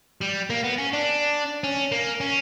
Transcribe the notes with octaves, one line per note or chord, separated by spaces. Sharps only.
G3
A#3
B3
C#4
D4
C#4
A#3
C#4